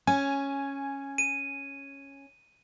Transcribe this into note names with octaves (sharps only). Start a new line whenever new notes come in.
C#4 G#5
D#7